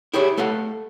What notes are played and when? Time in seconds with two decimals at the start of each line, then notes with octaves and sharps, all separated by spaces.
0.14 E4 G4 G#4 C#5
0.37 A3 A4 F5 F#5